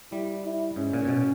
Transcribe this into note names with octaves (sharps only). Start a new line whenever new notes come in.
G3 E4
E4
G#2 C#4
A#2
A#2
B2